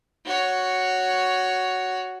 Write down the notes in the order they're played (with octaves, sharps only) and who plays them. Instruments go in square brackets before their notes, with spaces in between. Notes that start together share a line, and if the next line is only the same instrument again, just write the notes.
[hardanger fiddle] F#4 C#5